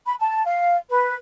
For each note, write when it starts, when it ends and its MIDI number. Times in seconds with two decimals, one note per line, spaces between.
0.06 0.14 83
0.19 0.44 81
0.45 0.77 77
0.90 1.14 71